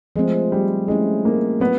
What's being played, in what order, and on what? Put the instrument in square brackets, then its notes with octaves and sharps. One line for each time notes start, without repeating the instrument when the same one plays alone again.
[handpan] F3 A3 C4 [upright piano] G#3
[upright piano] G3
[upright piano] G#3 [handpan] A3 C#4 E4
[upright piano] A#3
[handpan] F#3 A3 D4 [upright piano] B3